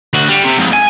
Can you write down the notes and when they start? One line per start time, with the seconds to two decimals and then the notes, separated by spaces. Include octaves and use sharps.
0.13 D2 F#4
0.29 G3
0.44 C3
0.58 F2 G#2
0.73 G#5